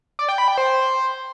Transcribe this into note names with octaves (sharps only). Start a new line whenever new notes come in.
D5
G5
B5
G5
C5